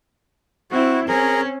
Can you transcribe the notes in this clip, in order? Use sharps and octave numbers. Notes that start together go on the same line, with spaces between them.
C4 E4 F#4
C4 C#4 G#4 A#4